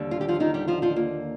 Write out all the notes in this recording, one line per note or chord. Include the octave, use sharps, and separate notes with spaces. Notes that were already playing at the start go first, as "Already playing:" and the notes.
Already playing: D#2 D3 G3
F4
G4
F3 F4
D#3 D#4
G3 G4
F3 F4
F3 F4
A#3